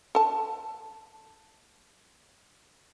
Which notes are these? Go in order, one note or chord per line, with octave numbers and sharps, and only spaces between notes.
A4 A5